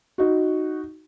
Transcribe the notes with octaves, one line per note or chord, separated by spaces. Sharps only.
D#4 F#4